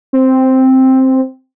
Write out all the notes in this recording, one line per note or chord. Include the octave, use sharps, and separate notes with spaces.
C4